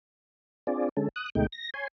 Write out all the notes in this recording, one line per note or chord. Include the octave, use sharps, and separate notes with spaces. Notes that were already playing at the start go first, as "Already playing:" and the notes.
C4 D4 F4 G#4 D5
D3 G#3 C#4 A4
D#6 F#6
D2 B2 G#3 A3 D#4 G5
A#6
C#5 G#5 C6